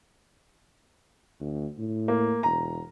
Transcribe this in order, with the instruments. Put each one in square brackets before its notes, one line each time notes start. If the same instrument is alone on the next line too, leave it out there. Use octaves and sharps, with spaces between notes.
[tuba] D2
A2
[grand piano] A#3
[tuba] E1 [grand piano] A#5